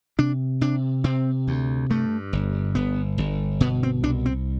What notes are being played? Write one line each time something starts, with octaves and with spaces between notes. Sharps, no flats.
C3 D4
C3 D4
C3 C4
D2
G2 A3
G1
G1 B3
G1
B2 B3
C4
C2 D4
C4